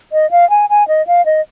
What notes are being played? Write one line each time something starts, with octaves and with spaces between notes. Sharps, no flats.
D#5
F5
G#5
G#5
D#5
F5
D#5